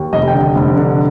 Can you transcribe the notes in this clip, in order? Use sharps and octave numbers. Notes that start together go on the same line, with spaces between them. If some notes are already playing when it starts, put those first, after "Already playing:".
Already playing: D#2
F1 D#5
G5
D3
F1
D3